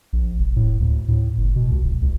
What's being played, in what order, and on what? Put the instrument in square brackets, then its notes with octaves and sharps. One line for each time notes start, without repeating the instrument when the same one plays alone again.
[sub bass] A#1
E1
A2
D2
A2
F#1
B2
C#2
D1
C#2